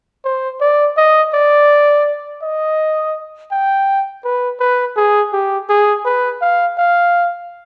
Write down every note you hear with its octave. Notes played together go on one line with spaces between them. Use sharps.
C5
D5
D#5
D5
D#5
G5
B4
B4
G#4
G4
G#4
B4
F5
F5